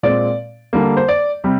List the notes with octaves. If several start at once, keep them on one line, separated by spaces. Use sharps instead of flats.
A#2 G#3 C4 D5
D3 G3 A#3
C5
D5
C3 G3